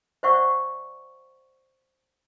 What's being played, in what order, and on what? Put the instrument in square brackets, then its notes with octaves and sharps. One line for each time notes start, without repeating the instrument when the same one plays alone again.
[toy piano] C5 D5 E5 F#5 C#6